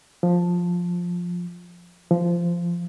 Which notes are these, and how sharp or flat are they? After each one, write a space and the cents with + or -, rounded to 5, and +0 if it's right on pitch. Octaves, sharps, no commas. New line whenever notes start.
F3 +10
F3 -15